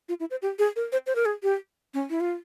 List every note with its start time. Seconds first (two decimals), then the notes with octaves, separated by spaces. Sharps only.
0.09 F4
0.20 E4
0.31 C5
0.42 G4
0.59 G#4
0.76 A#4
0.92 C5
1.07 C5
1.16 A#4
1.25 G#4
1.43 G4
1.94 C#4
2.10 E4
2.20 F4